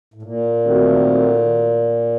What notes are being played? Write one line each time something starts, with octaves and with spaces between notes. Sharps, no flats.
A2
A#2
D#3 A3 C4 F#4